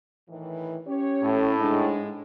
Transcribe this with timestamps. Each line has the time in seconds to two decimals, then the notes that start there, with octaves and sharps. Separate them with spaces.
0.29 A2 D#3 E3
0.87 C#4 G4 C#5
1.22 A2
1.60 G#2 G#3 D4